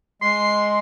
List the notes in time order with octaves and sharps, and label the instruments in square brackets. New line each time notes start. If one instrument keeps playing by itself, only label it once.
[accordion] G#3 [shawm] C6